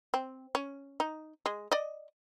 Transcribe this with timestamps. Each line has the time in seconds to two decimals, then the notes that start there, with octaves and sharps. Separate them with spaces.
0.14 C4
0.55 C#4
1.00 D#4
1.46 G#3
1.72 D5 D#5